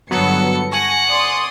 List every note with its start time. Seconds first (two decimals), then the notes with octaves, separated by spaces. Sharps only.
0.11 G1 G2 F#3 B3 A4 C#7
0.72 F#5 G#5 C#6 A#6
1.10 D5 C6 D#6